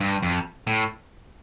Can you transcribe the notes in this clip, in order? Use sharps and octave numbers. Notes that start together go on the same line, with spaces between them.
G2
F2
A2